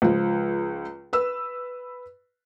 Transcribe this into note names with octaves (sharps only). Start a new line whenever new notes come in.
C#2 F3
B4 E6